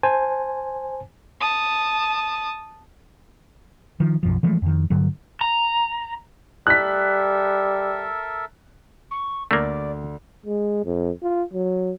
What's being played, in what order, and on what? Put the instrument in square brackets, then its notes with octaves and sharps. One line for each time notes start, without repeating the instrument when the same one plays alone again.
[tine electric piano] C5 G#5 A5
[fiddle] A5 D#6
[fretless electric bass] D#3 F3
B1 F#2 F3
E3 F3 G#3 A3
F2 D#3
G2 D3 F#3
[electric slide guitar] A#5
[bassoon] G3 [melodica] A4 A#4 E5 [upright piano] F#6 B6
[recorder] C#6
[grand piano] D2 [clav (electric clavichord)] A3 A#3 [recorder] D5
[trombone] G#3
F2
F4
F#3